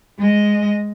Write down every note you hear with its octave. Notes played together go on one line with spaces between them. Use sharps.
G#3 D#5